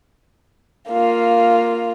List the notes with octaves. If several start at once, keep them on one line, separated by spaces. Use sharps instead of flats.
A#3 F4